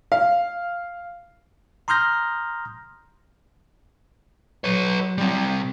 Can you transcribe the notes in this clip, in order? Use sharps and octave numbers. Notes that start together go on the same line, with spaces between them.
F5
A#5 C6 D#6 F6 G6 A#6
F#3 B4 C#5
G3 C4